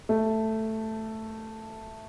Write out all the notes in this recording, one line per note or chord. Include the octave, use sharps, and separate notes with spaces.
A3